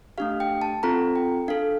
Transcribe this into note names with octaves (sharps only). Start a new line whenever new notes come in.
A3 D4 G4 F5
G5
A5
C4 F4 A4 A#5
G5
D4 A4 F5